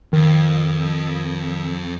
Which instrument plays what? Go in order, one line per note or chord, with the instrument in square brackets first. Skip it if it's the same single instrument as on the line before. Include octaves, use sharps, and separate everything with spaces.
[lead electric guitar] F2 [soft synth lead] D#3